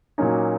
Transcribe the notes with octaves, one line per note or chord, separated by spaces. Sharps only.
A#2 F#3 A#3 C#4 D#4